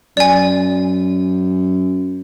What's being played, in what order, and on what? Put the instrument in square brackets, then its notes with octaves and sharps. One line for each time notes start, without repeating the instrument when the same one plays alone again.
[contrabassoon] F#2 [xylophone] D5 G#5